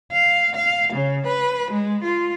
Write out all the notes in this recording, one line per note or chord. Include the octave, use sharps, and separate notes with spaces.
F5
F5
C#3
B4
G#3
F4